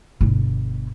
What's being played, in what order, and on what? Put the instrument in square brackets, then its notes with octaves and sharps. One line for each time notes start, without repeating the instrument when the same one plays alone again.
[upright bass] G1 B2